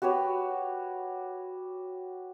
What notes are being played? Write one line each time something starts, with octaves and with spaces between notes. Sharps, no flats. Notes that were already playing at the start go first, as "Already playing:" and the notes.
F#4 G4 B4 C#5